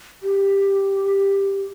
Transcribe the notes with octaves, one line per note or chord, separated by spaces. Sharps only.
G4